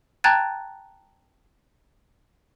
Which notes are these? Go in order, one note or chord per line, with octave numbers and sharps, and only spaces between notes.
G5 A5 A#5 F#6 G#6 A6